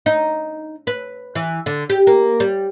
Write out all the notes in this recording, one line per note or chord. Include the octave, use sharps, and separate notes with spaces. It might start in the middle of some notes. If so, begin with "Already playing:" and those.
D#4
B4
E3
D3
G4
A#3
G3